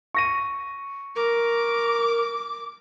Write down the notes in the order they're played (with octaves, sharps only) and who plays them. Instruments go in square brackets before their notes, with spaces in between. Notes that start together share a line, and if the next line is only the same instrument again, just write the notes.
[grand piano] C#6 A#6 D#7
[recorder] A#4 [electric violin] D6